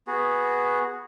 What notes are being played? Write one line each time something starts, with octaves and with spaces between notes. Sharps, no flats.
B3 F#4 G#4